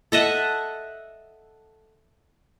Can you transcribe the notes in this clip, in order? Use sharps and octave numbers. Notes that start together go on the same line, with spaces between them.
A4 D#5 E5 F#5